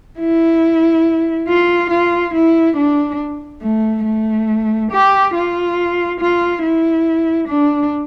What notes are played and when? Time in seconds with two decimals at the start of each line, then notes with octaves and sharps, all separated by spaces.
0.20 E4
1.48 F4
1.90 F4
2.35 E4
2.77 D4
3.62 A3
4.05 A3
4.91 G4
5.35 F4
6.20 F4
6.63 E4
7.48 D4